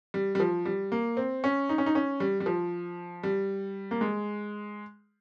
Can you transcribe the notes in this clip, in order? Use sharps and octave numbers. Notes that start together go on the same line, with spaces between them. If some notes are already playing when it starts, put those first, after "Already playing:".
G3
G3
F3
G3
A#3
C4
C#4
D#4
C#4
D#4
C#4
G3
G3
F3
G3
A#3
G#3